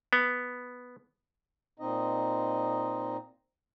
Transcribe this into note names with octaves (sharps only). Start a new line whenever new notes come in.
B3
A#2 C4 D#4 D#5